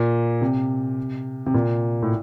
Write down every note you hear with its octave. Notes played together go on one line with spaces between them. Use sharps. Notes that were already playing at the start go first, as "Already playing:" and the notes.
Already playing: A#2
C3
C3
A#2
A2